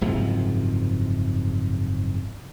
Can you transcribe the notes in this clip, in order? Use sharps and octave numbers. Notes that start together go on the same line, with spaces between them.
F#1 G#2 C3 F3